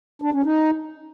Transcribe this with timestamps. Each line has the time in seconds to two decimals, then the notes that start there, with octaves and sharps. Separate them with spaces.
0.22 D4
0.33 C#4
0.44 D#4